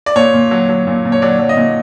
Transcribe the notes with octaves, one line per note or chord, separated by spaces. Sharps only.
D5
A#2 C#5
A#2
F#3
F#3
A#2
A#2
C#5
F#3 D5
F#3
D#5
A#2